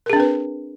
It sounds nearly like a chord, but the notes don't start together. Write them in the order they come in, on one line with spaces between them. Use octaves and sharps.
A#4 G#4 D4 C4 B4